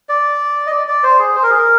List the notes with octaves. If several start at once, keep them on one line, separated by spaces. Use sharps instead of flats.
D5
D#5
D5
D5
C5
G#4
C5
A#4
G#4
A#4